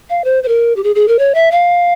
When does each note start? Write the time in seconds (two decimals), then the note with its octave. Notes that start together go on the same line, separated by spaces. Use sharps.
0.10 F5
0.24 C5
0.43 C5
0.48 A#4
0.76 G4
0.84 G#4
0.95 G#4
1.08 A#4
1.19 C#5
1.35 E5
1.52 F5